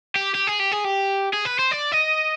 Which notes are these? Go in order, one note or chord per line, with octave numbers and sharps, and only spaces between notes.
G4
G4
G#4
G4
G#4
G4
G#4
B4
C5
D5
D#5